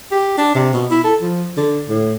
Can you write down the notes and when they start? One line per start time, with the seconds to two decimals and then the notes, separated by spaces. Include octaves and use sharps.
0.11 G4
0.38 D4
0.55 C3
0.74 B2
0.91 E4
1.04 A4
1.21 F3
1.57 D3
1.89 A2